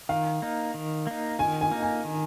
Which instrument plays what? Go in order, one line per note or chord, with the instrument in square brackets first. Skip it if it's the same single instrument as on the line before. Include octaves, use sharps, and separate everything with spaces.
[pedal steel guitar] D#3 [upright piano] F5
[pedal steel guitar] A#3 D#4
D#3
A#3 D#4
[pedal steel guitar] D#3 [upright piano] G#5
[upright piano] G#5
[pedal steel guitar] A#3 D#4
[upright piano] G#5
[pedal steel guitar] D#3